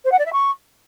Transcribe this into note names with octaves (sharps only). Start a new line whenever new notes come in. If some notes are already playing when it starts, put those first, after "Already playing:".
C5
F#5
D5
E5
C#6